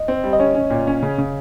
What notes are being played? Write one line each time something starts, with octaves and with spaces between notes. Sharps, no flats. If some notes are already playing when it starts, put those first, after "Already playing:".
Already playing: D#5
C4
G3
D#5
C#4 C#5
C#4
A#2
C#4
C#3
C#3